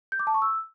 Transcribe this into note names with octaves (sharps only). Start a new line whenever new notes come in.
G6
D6
A5
C#6
E6